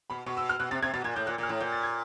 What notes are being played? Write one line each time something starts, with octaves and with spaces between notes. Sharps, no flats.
B2 B5
B2 C#6
E6
F6
B2 F#6
C3 A6
C3 G#6
B2 A6
A#2 G#6
A2 G6
A#2 F#6
A#2 F6
A2
A#2 G6
A6
G#6